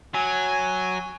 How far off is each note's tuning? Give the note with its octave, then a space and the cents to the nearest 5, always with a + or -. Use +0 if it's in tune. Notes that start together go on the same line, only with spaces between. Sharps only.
F#3 +0 G#5 +0